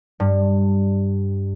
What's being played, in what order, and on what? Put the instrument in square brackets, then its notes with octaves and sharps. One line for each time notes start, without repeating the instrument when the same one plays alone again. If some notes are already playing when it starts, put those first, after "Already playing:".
[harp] G2